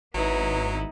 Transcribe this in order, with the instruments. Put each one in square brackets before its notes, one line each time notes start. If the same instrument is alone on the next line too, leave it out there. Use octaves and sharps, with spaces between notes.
[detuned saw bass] G#1 [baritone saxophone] F#3 [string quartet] B3 D#4 E4 [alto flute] B4